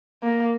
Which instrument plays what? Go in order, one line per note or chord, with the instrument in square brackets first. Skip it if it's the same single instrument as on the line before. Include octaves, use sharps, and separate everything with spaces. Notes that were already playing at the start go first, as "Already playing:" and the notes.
[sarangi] A#3